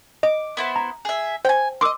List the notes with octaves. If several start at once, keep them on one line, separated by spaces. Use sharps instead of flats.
D#5 D6
B3 E4 C5
A#5
G#4 E5
C5 G5 G#5
A#4 D#5 C6 D6 E6